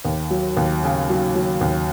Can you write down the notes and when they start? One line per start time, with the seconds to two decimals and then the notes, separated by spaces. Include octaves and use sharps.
0.05 D#2
0.31 F#3
0.57 D#2
0.84 C#3
1.10 F#3
1.35 F#3
1.61 D#2